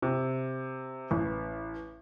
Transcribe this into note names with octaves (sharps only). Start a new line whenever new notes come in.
C3
A1